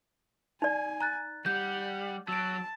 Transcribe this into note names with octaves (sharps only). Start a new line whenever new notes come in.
D#4 D5 G#5
A#5 F#6 A6
G3 F#5 G6
F#3 A5 E6 D7